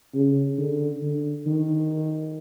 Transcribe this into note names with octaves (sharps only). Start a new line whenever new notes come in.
C#3
D3
D3
D#3